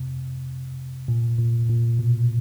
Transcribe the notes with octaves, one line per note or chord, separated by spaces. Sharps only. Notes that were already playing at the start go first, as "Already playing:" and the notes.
Already playing: C3
A#2
A#2
A#2
B2